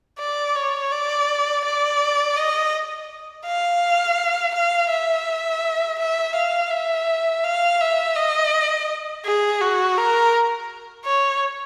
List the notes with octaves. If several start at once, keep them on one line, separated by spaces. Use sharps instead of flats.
D5
C#5
D5
D5
D#5
F5
F5
E5
E5
F5
E5
F5
E5
D#5
G#4
F#4
A#4
C#5